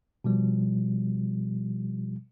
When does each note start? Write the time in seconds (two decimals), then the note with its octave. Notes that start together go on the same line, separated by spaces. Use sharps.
0.24 B2 F3 G3